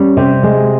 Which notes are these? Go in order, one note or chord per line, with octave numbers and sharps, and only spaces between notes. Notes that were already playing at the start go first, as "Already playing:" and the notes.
Already playing: G3 C#4
C3
G#3